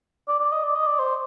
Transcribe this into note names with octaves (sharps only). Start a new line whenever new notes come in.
D5
D5
D#5
D5
D#5
D5
C5